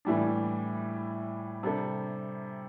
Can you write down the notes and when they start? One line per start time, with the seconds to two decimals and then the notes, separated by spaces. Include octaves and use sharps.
0.05 A2 E3 G3 D4
1.63 C3 G3 D4 A4